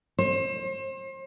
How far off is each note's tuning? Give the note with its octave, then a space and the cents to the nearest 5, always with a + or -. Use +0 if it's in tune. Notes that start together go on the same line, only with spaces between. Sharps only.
C5 +35